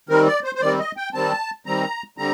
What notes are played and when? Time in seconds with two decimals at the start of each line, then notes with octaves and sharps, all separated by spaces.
0.09 D#3 G3 C4 A#4
0.27 D5
0.44 C5
0.55 C5
0.61 D#3 G3 C4 D5
0.79 D#5
0.97 G5
1.14 D#3 G3 C4 A5
1.66 D#3 G3 C4 A#5
2.18 D3 G3 C4 A#5